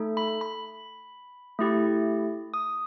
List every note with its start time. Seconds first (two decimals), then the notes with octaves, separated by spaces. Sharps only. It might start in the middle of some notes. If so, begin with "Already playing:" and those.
Already playing: A3 D#4 A4
0.17 B5
0.41 B5
1.59 A3 E4 G4
2.54 D#6